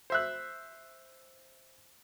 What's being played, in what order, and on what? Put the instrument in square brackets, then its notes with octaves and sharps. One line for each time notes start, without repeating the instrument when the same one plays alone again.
[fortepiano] C5 E5 F#6